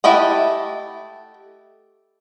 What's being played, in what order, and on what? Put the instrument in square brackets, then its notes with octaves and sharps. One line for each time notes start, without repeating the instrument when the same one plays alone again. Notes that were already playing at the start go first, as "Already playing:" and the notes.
[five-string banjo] A3 E4 G4 D#5 F#5